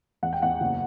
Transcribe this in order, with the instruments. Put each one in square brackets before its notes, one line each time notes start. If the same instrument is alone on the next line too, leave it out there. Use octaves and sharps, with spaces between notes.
[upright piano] E2 F#5
G5
E2 F#5
F#1